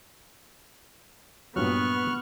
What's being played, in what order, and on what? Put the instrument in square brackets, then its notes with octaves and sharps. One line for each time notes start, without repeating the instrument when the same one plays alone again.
[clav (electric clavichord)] G2 A#2 F#3 [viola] B3 [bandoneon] C#6 F6 F#6